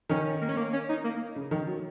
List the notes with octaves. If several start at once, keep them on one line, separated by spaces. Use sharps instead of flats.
D#3 C#4
A#3
C#4
A#3
C#4
D#4
A#3
C#3
D#3
F#3